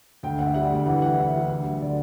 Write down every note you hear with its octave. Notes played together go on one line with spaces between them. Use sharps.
D2 G5
D2 F#5
E5
G3 F#5
D2
E3 F#5
G3 F#5
E3 E5
G3
D2
F#3
D3 D5